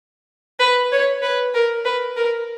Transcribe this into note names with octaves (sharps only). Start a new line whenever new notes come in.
B4
C#5
B4
A#4
B4
A#4